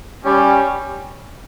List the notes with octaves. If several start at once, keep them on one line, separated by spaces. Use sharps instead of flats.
G3 C#4 G4